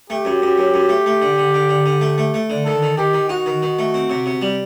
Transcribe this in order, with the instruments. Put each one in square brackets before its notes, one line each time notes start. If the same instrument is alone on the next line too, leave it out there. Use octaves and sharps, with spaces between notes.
[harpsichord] A3 [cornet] G4
[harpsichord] F#2
F#2
F#2
F#2
A3
A3
D3
D3
D3
D3
D3
A3
A3
A3
D3
[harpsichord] D#3 [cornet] A4
[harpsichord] D#3
[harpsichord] D#3 [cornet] G4
[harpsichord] D#3
[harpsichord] D#4 [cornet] F#4
[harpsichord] D#3
D#3
A3
C4
C3
C3
G3